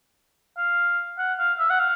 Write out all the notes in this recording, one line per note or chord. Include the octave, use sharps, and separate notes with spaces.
F5
F#5
F5
E5
F#5
F5